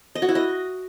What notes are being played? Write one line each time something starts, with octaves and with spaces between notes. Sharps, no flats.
D#5
F#4
E4
D#5